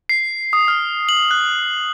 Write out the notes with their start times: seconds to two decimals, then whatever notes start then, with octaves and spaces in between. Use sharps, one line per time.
0.09 C7
0.53 D#6
0.68 F6
1.09 F#7
1.31 F#6